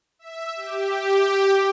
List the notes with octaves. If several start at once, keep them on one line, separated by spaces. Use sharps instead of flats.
E5
G4